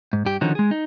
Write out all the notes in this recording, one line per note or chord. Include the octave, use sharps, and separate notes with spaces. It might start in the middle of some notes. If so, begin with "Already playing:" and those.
G#2
G2 G4
D3 D#3 F3 C#4 D#4 F#4
G#3 G#4
D#4